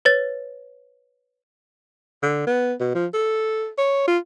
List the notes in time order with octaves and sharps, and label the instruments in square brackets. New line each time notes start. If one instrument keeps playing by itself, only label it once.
[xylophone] B4 C#5 A6
[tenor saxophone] D3
B3
B2
F3
A4
C#5
F4